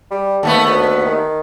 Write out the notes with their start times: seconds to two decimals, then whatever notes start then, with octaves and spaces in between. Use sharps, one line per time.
0.11 G3
0.43 D#2 A3 B3 A4
0.66 D2
1.06 D#3